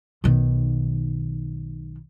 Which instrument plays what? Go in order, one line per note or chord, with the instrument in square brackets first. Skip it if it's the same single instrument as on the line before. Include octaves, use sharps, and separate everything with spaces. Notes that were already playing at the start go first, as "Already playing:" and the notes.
[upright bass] B1 D#3